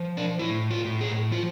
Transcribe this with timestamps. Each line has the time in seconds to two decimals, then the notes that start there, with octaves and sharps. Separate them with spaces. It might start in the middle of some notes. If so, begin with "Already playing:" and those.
Already playing: F3
0.17 D4
0.39 A2 E4
0.71 F4
0.85 A2
1.01 G#4
1.31 F3 F4